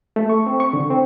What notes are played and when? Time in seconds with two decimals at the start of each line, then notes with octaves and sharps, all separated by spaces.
0.16 A3
0.29 C#6
0.46 C4
0.60 C#6
0.73 D3
0.90 C4